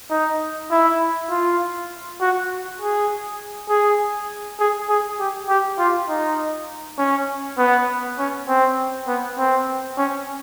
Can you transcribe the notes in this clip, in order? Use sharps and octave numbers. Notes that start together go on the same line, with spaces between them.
D#4
E4
F4
F#4
G#4
G#4
G#4
G#4
G4
G4
F4
D#4
C#4
B3
C#4
C4
B3
C4
C#4